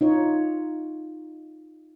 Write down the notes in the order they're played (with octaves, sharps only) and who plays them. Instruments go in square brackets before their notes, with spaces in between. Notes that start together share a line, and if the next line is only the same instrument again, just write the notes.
[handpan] D#4 F4 C#5